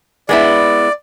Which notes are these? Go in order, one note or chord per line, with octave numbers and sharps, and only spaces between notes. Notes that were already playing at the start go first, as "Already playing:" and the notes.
G#3 B3 E4 D5